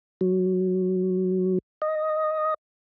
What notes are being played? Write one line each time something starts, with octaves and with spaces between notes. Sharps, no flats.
F#3
D#5